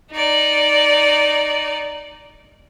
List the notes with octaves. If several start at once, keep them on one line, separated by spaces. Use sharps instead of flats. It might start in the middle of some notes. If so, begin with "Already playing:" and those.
D#4 D5